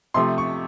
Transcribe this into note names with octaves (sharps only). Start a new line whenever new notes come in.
C3 F3 A3 C6
C#6